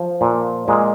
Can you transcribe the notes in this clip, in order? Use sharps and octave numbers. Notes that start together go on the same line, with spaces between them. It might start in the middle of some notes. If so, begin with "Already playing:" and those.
Already playing: F3
A#2
A#2 G#3